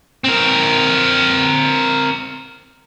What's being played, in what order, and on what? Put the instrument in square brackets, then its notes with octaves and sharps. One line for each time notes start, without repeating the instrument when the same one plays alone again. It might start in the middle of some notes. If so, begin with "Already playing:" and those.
[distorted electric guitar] C4 A#4